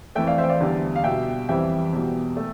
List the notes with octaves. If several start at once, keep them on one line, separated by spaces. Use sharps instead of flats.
F2 E3 A3 E5 G5
D5 F5
C5 E5
G5
D5 F5
E2 D3 G3
F5
B2 G3 E5 G5
F2 E3 G3 E5 G5
E2 B2 G3
A3